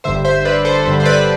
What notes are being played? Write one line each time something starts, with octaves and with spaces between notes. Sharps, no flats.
G1 G2 D3 C5 E5
C5 E5
B4 D5
A4 C5
G1 G2 D3 B4
C5
B4 D5